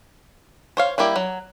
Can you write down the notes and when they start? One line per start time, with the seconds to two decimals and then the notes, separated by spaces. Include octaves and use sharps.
0.77 C5 C#5 F5
0.98 G3 A#3 E4 G4
1.16 F#3